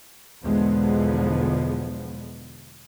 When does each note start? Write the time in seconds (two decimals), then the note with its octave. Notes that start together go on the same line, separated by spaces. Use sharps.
0.43 B1 E2 D3 F3 G#3 B3